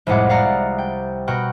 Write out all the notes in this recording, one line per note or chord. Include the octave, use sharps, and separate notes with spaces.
C2 F2 A2 G#3 F#5 D6
D5 F5 F#5 A#5
G5
B2 A#4 F#5 G5 C#6